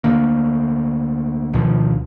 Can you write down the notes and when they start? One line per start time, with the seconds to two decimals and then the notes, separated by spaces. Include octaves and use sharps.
0.04 D2 D3 A#3
1.53 D2 B2 D#3 F3